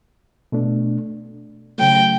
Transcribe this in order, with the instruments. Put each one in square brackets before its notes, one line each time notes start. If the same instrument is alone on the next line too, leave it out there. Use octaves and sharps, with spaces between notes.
[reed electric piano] B2 A3 D4
[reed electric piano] C#3 F#3 A3 [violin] G5